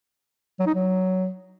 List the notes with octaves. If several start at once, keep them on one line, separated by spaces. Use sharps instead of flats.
F#3
D#4
F#3